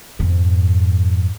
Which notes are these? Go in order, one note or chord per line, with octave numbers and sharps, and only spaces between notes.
F2 G#2